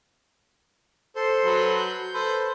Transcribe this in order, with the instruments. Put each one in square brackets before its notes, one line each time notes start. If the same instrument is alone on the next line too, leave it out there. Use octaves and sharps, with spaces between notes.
[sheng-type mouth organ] A4 C5 C6
[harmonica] F#3 B4
[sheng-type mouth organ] G6
[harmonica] A4 B4 C5